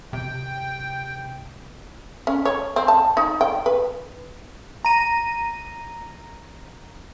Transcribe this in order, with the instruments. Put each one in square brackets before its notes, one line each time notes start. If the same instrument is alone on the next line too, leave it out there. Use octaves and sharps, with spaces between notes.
[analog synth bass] C3 [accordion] G5
[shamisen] C#4
C#5
C4
A5
D#4
G5
B4
[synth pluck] A#5 D#7